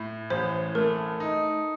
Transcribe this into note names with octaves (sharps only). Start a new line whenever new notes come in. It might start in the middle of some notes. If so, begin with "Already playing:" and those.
Already playing: A2
A1 C5
A3 A#4
D#4